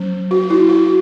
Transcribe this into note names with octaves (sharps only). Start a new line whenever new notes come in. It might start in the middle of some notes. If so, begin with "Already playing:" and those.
Already playing: F#3 C#4
F#4
E4
F#4